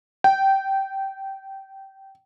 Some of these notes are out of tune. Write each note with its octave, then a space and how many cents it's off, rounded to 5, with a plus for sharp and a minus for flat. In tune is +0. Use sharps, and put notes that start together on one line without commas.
G5 -15